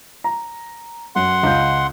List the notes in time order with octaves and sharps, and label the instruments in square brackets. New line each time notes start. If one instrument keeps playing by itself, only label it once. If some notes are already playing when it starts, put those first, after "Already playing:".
[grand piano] A#5
[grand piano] F#2 [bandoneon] F#5 C6
[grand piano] C#2 G6